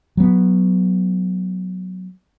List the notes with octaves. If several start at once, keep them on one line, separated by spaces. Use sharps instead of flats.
F#3 B3